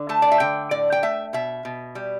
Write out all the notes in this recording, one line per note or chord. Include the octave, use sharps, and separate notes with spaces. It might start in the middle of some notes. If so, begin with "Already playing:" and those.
Already playing: D3
A3 A5
D5
E5
D3 G5
A2 D5
G5
A3 E5
B2 E5
B2
G3